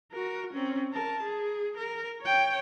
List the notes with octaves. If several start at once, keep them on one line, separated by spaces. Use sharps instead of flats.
F#4 A#4
C4 C#4
A#4 A5
G#4
A#4
C#5 G5